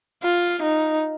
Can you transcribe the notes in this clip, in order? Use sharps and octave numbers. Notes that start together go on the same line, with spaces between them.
F4
D#4